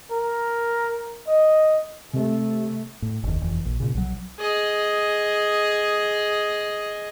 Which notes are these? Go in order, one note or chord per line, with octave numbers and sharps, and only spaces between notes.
A#4
D#5
C3 A3
A2
F#1 D#2
F1 E3
A#1
A#2 C#3
B1 F#3
G#4 D#5